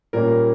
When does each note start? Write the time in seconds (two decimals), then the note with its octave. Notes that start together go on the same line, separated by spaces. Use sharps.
0.13 A#2 G3 A#3 C#4 A#4